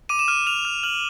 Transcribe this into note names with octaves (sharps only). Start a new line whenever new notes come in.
D6 D#7
E7
F6 D#7
F6 F7
F6
F6 F#7